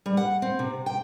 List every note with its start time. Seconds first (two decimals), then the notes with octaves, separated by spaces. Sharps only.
0.06 G3
0.17 F#5
0.42 C4
0.59 C3
0.86 G5